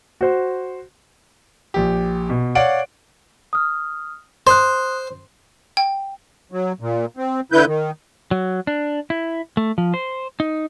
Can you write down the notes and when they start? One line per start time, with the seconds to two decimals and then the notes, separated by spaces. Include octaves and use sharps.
0.21 F#4 C5
1.74 A#1 G4
2.30 B2
2.55 C#5 D5 F5 F#5 D7
3.53 D#6 F6
4.47 C5 C6 D#6 F#6
5.77 G5
6.52 F#3
6.80 A#2
7.17 C4
7.52 D3 E4 B4 G6
7.65 D#3
8.31 F#3
8.67 D4
9.10 E4
9.57 A3
9.78 F3
9.94 C5
10.40 D#4